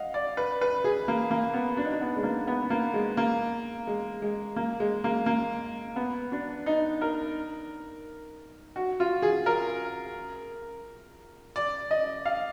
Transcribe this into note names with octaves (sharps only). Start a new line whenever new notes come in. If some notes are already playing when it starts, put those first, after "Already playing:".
Already playing: D#5 F5 F#5
D5
B4
B4
G#4
A#3
A#3
B3
D4
D#4
D4
B3
G#3
A#3
B3
A#3
G#3
A#3
G#3
G#3
A#3
G#3
A#3
A#3
B3
D4
D#4
A#4
F#4
F4
G#4
A#4
D5
D#5
F5